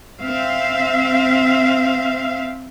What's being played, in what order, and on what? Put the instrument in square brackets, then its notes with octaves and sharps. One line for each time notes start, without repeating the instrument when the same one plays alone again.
[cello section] C4 E5 F5